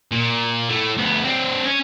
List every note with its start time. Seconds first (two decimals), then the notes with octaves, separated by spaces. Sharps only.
0.11 A#2
0.69 A3 E4
0.98 D2 B3
1.25 C4 D4
1.65 C#4